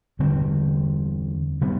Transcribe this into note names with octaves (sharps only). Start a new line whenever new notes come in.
E2 D3 G3 C4
C3 G3 B3